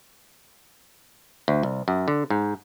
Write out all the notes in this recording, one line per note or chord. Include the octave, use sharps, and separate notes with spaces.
D2
C2
F#2
D3
G#2